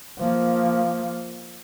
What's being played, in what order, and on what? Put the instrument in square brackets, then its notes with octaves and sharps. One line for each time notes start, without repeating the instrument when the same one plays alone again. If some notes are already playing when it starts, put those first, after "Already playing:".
[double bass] F3 A#3